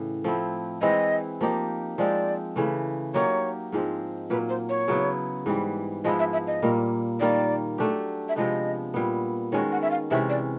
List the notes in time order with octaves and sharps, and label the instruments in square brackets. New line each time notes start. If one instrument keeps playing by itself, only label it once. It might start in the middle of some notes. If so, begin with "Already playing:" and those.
Already playing: [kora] A2 C#3 E3 C#4
F3 A3 C4 E4
[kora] E3 G#3 C4 E4 [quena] D#5
[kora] F3 A#3 D#4 G4
[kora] F3 G#3 C4 [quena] D5
[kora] C#3 E3 A3
[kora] F#3 A#3 D#4 G4 [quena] C#5
[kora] G#2 F3 G#3 C4
[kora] A#2 F#3 A#3 [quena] B4
[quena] C5
C#5
[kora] C#3 F#3 B3 E4
G#2 E3 G3
[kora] F3 G#3 B3 E4 [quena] D#5
[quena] E5
E5
D#5
[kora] A#2 G3 A#3
[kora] D#3 G3 A#3 D#4 [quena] D5
[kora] F#3 A3 D4 G4
[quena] E5
[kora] C3 F3 G#3 B3 [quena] D#5
[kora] A#2 G3 B3
[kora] D#3 G#3 C#4 F#4 [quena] C#5
[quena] F#5
E5
F5
[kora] C3 E3 G#3 C#4 [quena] E5
[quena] D5